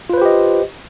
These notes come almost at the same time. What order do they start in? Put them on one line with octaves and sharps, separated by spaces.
F4 B4 C5 G4 D#5